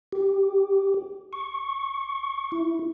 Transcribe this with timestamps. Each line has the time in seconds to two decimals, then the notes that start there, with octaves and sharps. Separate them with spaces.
0.12 G4
1.33 C#6
2.52 E4